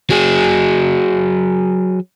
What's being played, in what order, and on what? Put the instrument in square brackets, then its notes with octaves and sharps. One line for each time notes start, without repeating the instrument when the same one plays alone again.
[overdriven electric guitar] F#3 G#4